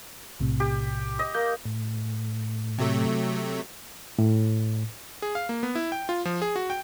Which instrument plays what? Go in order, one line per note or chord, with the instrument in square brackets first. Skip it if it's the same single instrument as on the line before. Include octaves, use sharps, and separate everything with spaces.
[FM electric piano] B1 A2 C3
[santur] G4
D#5
[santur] A#3 [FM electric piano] G6
[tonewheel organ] A2
[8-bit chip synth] C3 F#3 A3
[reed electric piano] A2
[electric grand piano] G#4
F5
A#3
B3
E4
G5
F4
F3
G#4
F#4
G5